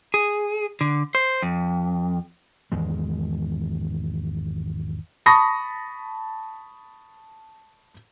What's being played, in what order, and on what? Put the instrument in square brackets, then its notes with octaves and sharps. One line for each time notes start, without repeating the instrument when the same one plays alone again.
[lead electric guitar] G#4
D3
C5
F2
[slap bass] G#1 E2 G#3
[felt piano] A5 B5 C#6 D#6 A#6